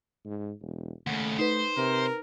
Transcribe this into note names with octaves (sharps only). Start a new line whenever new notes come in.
G#2
E1
D#2 C#3 A3 F#5
D#4 B4 C5
C3 A#4